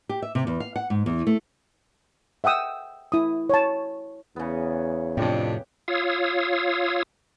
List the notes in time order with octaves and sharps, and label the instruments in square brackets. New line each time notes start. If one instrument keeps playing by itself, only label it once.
[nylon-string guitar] G4
E5
C3
E2
F5
F#5
G#2
E2
A3
[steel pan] E5 F#5 G5 D#6 E6
E4 D#6
C#5 A5
[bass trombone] E2 [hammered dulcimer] C#3 B3
[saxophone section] F2 D4 [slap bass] A2 C3 [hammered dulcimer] G4
[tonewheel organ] F4 C#5 F5 D#6 E6